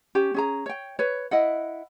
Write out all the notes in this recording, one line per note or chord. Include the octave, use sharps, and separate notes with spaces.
C#4 G4
C#4 G#4 A#5
C#5 G5
B4 C#5
E4 D#5 F#5